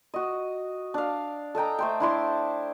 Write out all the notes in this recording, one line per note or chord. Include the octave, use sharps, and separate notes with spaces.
F#4 D#5
D4 F5
A4 D#5 G5 A#5
A3 C5 G5
D4 E4 C6 D6